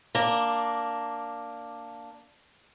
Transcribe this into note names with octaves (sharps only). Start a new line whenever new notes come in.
A#3 D4